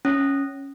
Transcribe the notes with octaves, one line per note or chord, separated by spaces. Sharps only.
C#4